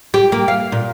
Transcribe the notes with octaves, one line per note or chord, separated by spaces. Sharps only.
G4
A#3
F5
A#2